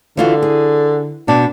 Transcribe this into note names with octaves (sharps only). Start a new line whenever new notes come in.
D3 E3 F4 F#4
G#4
B2 D4